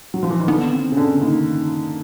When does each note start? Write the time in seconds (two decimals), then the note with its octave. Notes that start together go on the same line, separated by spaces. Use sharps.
0.14 F#3
0.23 F3
0.30 E3
0.40 D#3
0.48 D3 B3
0.72 C4
0.92 C#3
0.97 D3 B3
1.21 D#3 A#3